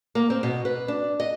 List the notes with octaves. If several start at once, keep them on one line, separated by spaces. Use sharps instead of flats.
A#3
C4
B2
B4
D4
D#5